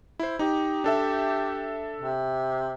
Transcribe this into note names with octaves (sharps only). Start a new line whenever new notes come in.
E4 C5
D#4 G4
D4 A4 E5
C3